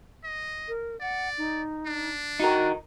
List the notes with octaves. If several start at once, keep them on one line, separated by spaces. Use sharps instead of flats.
D#5
A#4
D5 F#5
D#4
D4
D#4 F#4 A#4